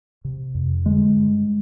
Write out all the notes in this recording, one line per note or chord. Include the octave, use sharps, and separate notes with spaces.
C3
F2
D3 G#3
G2